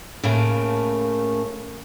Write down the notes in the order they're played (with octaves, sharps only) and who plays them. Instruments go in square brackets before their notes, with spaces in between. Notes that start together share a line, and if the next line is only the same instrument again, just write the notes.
[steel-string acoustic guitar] A2 C#3 A3 A#3